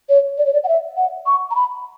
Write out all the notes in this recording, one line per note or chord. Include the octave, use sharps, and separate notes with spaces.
C#5
D5
C#5
D5
F#5
E5
F#5
C#6
A#5
B5